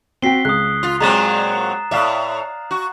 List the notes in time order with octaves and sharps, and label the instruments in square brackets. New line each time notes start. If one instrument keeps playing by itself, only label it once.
[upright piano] C4 F#4 G5 [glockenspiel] B6 C7 G7
[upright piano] C#2 [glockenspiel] D#6 F#6
[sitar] F4
[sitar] A#2 F#3 C4 [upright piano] G#3 [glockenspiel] A#5 A6 E7
[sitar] A2 E5 [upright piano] D5 F5
[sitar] F#4